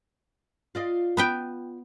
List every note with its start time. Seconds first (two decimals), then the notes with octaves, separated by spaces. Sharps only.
0.75 F4 D5 D#5
1.17 B3 B4 G5